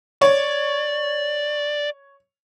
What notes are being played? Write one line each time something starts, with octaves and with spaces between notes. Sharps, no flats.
C#5 D5